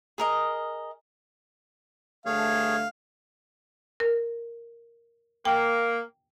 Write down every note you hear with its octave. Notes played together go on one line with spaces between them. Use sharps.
G#4 A#4 D#5
G2 D3 A3 G#4 C#5 F5
A#4
A#3 G5